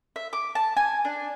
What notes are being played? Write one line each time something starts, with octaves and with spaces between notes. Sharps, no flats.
E5
D6
A5
G#5
D4